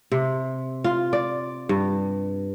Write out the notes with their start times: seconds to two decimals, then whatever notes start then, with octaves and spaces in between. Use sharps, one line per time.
0.12 C3
0.84 F4
1.13 D5
1.69 G2